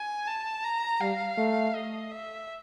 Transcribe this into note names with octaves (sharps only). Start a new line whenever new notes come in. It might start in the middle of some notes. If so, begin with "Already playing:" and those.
Already playing: G#5
A5
A#5
G3 F5
A3
D#5
E5